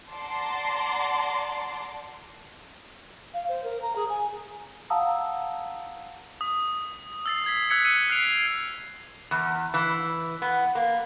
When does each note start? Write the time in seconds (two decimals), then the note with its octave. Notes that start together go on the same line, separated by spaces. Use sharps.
0.12 D5 F#5 A5 A#5 C6 D6
3.34 F5
3.48 C5
3.63 A#4
3.82 A#5
3.96 G#4
4.09 G#5
4.90 F5 F#5 A5 A#5 D#6 E6
6.41 D#6
7.26 E6 A6 C7
7.44 E6 G#6 B6
7.70 D#6 E6 F#6 G#6 B6 C#7
7.85 E6 F#6 C#7 D#7
8.09 F6 F#6 B6 C7 D7 F7
9.31 E2
9.74 E3
10.42 B3
10.75 A#3